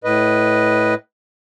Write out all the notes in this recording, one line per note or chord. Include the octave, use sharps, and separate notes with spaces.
A2 B4 D#5